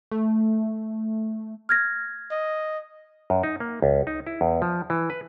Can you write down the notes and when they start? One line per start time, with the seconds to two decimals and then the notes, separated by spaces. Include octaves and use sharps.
0.11 A3
1.69 F6 G#6 A#6
2.32 D#5
3.30 F#2
3.43 D#4
3.60 A#3
3.82 C#2
4.07 D#4
4.27 E4
4.41 E2
4.62 F3
4.90 E3
5.10 B4